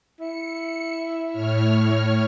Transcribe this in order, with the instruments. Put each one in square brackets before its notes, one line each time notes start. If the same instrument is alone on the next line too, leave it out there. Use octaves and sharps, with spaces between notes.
[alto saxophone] E4 [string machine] C#7
[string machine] A2 C#5 F6